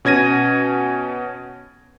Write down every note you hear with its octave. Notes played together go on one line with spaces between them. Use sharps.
B2 C#4 G#6 A#6 D#7